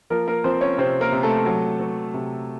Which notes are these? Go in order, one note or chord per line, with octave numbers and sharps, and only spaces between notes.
F3 A#3 A#4
A#3 A#4
F3 C4 C5
C#4 C#5
C3 C4 C5
A#3 A#4
C3
A3 A4
F#3
F#3
C3